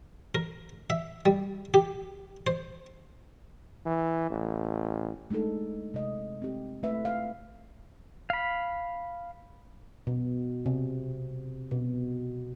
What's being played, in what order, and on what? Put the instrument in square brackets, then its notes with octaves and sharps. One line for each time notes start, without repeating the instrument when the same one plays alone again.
[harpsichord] A#4
E5
G3
G4
C5
[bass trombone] E3
A1
[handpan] G#3 A3 D4 D#4 A4
C3 G#3 D#5
C4 G4
A3 B4 E5
F5
[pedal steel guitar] F5 B5
[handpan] B2
C3
B2